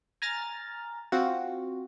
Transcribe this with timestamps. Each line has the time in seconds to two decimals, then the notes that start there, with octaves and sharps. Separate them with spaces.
0.22 G#5 A#5 F6 A6
1.12 C4 F4 F#4